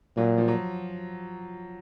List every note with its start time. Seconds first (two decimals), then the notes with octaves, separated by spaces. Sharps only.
0.16 A#2 F#3
0.38 F3
0.48 F#3